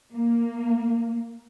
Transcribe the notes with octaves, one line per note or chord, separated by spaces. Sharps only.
A#3